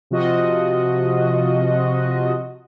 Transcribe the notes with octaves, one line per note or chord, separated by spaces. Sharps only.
C3 F3 F4 F#4 D#5